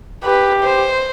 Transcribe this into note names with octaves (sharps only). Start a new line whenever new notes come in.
G4 B4
C5